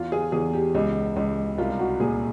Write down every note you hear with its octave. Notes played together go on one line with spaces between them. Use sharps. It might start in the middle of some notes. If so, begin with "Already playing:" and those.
Already playing: E2 F4
G#4
E2 G#4
G4
C#2
C#2
C2 F4
F#4
A#2 G#4